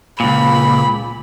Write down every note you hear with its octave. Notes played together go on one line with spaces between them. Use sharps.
C#2 A#2 B5